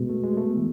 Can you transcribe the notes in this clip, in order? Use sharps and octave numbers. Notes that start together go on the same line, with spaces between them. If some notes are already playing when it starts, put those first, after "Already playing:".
Already playing: B2 G#3
A3
G#3
A3
E3